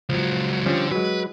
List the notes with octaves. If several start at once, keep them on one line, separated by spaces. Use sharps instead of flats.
C#2 F3 F#3
D3 F3 G3 C#4
F#3 G#3 B4